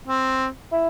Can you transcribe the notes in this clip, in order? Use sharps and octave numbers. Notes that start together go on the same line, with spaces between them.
C4
E4